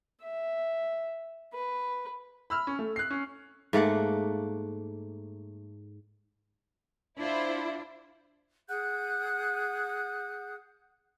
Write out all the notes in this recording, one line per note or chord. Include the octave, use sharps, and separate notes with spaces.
E5
B4
B5 E6 F6
C#4
A3
F#6 C7
C#4
G#2 A3 A#3 F#5
D4 E4 F4 C5
G#4 F#5 F#6 G6